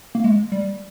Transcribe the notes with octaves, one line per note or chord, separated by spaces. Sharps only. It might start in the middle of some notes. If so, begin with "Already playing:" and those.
A#3
G#3
G3